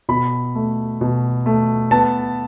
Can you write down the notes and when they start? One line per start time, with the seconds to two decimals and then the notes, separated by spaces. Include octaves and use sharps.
0.09 B2 B5
0.55 A3
1.01 B2
1.46 A3
1.91 B3 A5